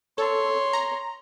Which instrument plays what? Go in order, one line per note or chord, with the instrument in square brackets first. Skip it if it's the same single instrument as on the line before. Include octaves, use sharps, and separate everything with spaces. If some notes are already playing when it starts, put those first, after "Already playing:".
[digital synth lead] A4 [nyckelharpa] C#5 C6
[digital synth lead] A#5